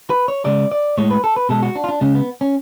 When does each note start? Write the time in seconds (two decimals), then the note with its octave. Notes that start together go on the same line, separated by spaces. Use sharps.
0.10 B4
0.28 C#5
0.45 C#3 G#3 D5
0.72 D5
0.98 A2 G#3 C#5
1.11 B4
1.24 A4
1.36 B4
1.49 B2 G#3 A4
1.62 F#4
1.75 D4
1.84 F4
1.89 D4
2.01 C#3 G#3 C#4
2.15 B3
2.41 C#4